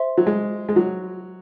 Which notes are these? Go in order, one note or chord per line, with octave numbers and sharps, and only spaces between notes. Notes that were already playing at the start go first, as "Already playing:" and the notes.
Already playing: C5 E5 C6
F#3
G#3
G#3
F#3